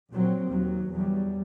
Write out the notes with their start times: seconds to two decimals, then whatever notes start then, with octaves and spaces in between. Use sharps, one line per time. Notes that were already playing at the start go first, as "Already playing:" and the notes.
0.11 A#1 A#2 F#3 C4
0.48 D#2 F#3
0.94 E2 F#3 G3